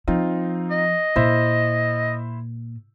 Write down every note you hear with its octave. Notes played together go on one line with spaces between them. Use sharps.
F3 C4 D#4 F4
D#5
A#2 E4 C5 E5